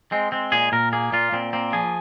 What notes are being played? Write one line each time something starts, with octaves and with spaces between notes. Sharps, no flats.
G#3 C4
G#3 C4
A#2 G#4
A#2 A#4
A#3 G#4
A#2 F4
A#2 C4
A#3 C4
F3 G#4